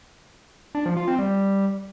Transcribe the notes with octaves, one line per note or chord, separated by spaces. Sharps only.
D4
F3
F4
C4
G3